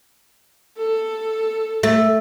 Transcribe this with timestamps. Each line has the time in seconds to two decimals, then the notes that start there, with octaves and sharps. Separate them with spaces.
0.78 A4
1.83 A3